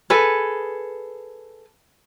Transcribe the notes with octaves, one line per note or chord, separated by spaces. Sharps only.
G#4 A4 B4